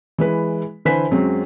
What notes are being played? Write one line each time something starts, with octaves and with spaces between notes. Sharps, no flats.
E3 G#3 B4
D3 E3 B4 C5 G#5 B6
F#2 F#3 G#3 C4